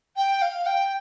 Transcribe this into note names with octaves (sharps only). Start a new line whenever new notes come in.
G5
F5
G5